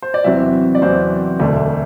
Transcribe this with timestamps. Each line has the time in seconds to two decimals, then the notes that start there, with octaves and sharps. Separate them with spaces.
0.02 C5
0.14 D5
0.24 E2 C3 F#3 C4 E5
0.75 D5
0.81 E2 C3 F#3 C4 C5
1.39 E1 D2 D3 A3 D4